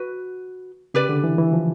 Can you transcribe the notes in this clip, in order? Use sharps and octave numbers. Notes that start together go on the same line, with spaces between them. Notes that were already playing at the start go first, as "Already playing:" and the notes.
Already playing: F#4 B4
C#3 G4 B4 D5
D3
E3
E3
F3